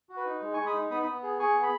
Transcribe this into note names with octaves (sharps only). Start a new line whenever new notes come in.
F#4
B4
D#4
G#3
G#3 G#5 C#6
B5 D#6
D#4
B3 B5 D#6
B3 B5 D#6
G#4
G#4 G#5 C#6
B3
B5